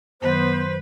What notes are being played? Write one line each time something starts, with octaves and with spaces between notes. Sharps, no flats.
F#2 D#3 F#3 B3 B4 C5